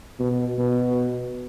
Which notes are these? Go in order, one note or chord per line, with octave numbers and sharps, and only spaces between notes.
B2
B2